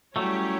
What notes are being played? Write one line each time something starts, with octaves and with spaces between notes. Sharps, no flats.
F#3 G3 A3 C#4 E4 G4 C#5